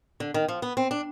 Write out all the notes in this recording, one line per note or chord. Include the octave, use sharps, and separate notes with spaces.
D3
D#3
F3
B3
C4
D4